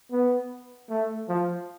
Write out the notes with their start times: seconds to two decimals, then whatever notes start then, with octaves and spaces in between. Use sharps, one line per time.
0.12 B3
0.90 A3
1.29 F3